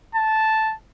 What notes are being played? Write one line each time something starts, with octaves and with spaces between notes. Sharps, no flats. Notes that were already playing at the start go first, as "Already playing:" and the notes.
A5